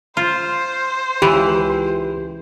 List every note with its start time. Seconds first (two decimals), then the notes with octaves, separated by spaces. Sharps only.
0.17 F4 C5
1.22 C#2 E3 G4